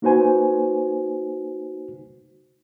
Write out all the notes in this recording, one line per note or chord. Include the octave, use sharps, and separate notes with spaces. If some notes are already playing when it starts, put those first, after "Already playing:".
A#3 D#4 F#4 B4 C5 G#5